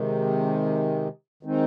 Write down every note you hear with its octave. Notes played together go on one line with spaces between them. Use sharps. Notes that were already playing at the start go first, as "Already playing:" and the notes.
Already playing: C3 D#3 G#3
D#3 G#3 C4 D#4